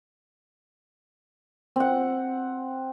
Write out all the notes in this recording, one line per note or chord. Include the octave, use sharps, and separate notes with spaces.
C4 F#5